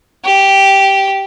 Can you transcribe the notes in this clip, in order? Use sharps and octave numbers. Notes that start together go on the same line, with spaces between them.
G4